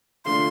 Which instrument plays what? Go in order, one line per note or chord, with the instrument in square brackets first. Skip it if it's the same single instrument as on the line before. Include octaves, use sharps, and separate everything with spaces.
[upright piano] D3 F3 A3 D4 F4 [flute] C6